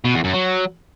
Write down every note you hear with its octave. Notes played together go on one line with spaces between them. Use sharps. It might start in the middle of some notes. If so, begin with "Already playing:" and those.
B2
E2
F#2
F#3